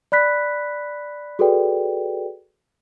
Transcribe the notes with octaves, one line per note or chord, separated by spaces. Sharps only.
D5 B5 F#6 B6
F#4 G#4 A4 B4 D5 G5